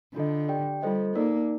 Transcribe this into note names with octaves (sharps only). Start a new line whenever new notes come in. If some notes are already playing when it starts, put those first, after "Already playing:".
D3 D4 F4 A4 D#5
G4 D5 G5
G3 F4 A4 C5 D#5
A#3 D#4 A#4 D5